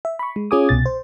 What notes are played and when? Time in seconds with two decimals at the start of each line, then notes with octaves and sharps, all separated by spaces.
0.05 E5
0.19 B5 C#6
0.36 G#3
0.51 C#4 F4 G#4 G#5 D6 D#6
0.69 C2 B2 A6
0.86 C5